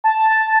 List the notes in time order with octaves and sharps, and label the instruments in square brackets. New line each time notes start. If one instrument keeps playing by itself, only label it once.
[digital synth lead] A5